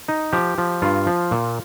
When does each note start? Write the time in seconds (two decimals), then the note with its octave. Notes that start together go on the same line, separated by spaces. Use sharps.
0.08 D#4
0.33 F3 G4
0.58 F3
0.82 G2 F4
1.07 F3
1.31 A#2